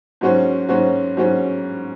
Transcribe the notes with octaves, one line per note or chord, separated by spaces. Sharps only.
G#2 F#3 C#4 F#4 C5
G#2 F#3 C#4 F#4 C5
G#2 F#3 C#4 F#4 C5